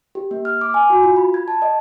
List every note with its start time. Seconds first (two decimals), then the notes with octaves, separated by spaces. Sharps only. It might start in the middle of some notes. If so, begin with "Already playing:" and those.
0.15 G4
0.31 A#3
0.45 F6
0.61 D6
0.74 G#5
0.90 F#4
1.03 F4
1.16 B5
1.34 G#6
1.48 A5
1.62 D#5